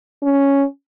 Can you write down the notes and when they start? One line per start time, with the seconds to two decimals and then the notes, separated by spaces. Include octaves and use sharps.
0.22 C#4